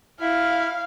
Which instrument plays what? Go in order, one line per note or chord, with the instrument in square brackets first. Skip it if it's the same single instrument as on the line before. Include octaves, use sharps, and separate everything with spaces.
[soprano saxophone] E4 [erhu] F5